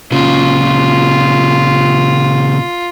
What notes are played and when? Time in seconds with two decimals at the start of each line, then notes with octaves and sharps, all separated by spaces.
0.12 A#2 C#3 F4